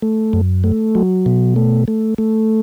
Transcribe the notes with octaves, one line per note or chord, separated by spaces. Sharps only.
A3
F#2
A3
F#3
B2
A3
A3
A3